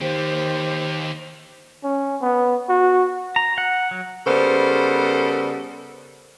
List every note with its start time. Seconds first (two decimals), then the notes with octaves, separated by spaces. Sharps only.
0.01 D#3 G4 C5
1.84 C#4
2.22 B3
2.69 F#4
3.36 A#5
3.58 F#5
3.91 F#3
4.27 C#3 G3 B3 A4 A#4 C5